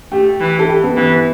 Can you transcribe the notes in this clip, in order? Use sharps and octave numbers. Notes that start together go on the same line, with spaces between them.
A3 G4
E3
A4
G4
B3
E3 B3